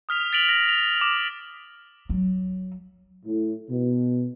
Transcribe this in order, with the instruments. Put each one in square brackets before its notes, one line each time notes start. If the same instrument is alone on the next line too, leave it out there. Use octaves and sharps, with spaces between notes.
[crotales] D#6 F6 B6 F7
A6 B6 D7 F7 F#7
A#6
F7
D6
[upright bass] F#3
[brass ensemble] A2
B2